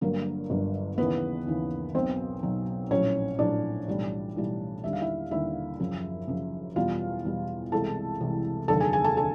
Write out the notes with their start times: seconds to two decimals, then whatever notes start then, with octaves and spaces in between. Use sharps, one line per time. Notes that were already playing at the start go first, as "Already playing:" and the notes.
0.01 G1 G2 D3 F#3 A#3 A#4
0.50 G1 G2 D3 F#3
0.98 D#2 C#3 E3 B3 B4
1.47 D#2 C#3 E3
1.95 B1 B2 F#3 C4 C5
2.43 B1 B2 F#3
2.90 A#1 A2 F#3 C#4 C#5
3.39 A#1 A2 F#3 D4 D5
3.88 B1 A2 E3 G3
4.36 B1 A2 E3 G3
4.84 D#2 D3 G3 E5
4.93 F5
5.01 E4 E5
5.31 D#2 D3 G3 E4 E5
5.80 F#1 F#2 C#3 F3
6.28 F#1 F#2 C#3 F3
6.76 E2 B2 G3 F4 F5
7.25 E2 B2 G3
7.72 C2 C3 E3 G#3 A4 A5
8.20 C2 C3 E3 G#3
8.68 F1 D#2 D3 F#3 A4 A5
8.80 G#4 G#5
8.92 G#4 G#5
9.04 A4 A5
9.17 D3 A4 A5